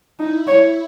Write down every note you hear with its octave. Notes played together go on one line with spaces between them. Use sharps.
D#4 E4
C#5